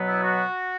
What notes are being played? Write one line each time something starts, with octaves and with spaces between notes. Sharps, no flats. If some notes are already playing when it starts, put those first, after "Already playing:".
Already playing: B2 F#3 B3
E4
F#4